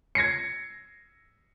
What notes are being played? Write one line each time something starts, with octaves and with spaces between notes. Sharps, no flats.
G#6 A#6 C7 C#7